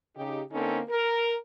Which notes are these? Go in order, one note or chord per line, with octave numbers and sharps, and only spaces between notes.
C#3 D#4 G4
D3 A#3 C4 C#4 D#4 A4
A#4